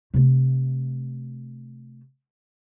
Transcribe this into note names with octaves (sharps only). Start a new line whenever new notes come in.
C3 A3